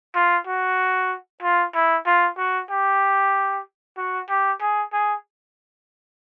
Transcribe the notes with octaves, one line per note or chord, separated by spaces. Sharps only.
F4
F#4
F4
E4
F4
F#4
G4
F#4
G4
G#4
G#4